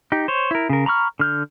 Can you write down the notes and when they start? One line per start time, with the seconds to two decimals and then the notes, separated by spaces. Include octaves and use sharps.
0.12 D#4 G4
0.28 C5 C#5
0.51 E4 A#4
0.69 C#3 A#4
0.86 A#5 B5 C#6 F6
1.19 D3 F6 G6